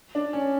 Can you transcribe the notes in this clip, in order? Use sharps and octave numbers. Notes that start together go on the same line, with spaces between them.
D4
C#4